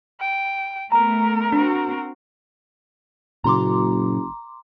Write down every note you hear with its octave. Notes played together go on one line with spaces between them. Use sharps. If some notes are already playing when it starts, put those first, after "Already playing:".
G5
A3 B3 A#4 A#5
C4 D4 F#4
F#1 A#2 C#3 F#3 A#5 C6 D6